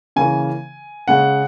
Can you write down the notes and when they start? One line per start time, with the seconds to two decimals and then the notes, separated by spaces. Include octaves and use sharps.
0.16 C#3 E3 A#3 G#5
1.08 C#3 G#3 F#5